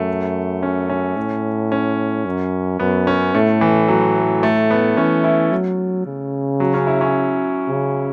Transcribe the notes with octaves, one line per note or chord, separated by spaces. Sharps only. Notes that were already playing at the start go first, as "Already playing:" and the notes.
Already playing: F#2 A3
C#4
C#4
A2
C#4
F#2
F#2 B3
C#4
A2 A3
E3
F#3
A3
B3
E3 C#4
E4
F#3
C#3
F#3
C#4
E4
C#4
C#3